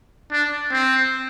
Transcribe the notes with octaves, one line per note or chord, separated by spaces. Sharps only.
D4
C4